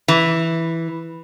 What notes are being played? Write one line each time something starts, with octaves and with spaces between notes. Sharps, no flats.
E3